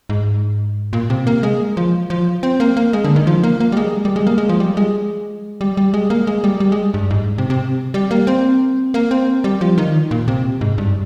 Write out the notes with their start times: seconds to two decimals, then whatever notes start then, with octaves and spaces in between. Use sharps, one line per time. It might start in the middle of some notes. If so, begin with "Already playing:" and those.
0.09 G#2
0.93 A#2
1.10 C3
1.27 A#3
1.43 G#3
1.77 F3
2.10 F3
2.43 C4
2.60 A#3
2.77 A#3
2.93 G#3
3.04 D3
3.16 D#3
3.27 F3
3.43 A#3
3.60 A#3
3.72 G3
3.77 G#3
4.05 G3
4.16 G#3
4.27 A#3
4.38 G#3
4.49 F3
4.60 G3
4.77 G#3
5.61 G3
5.77 G3
5.94 G#3
6.10 A#3
6.27 G#3
6.44 G3
6.60 G3
6.72 G#3
6.94 G2
7.10 G#2
7.38 C3
7.50 C3
7.94 G3
8.11 A#3
8.27 C4
8.94 A#3
9.11 C4
9.44 G3
9.61 F3
9.78 D#3
10.11 A#2
10.28 C3
10.61 G#2
10.78 G2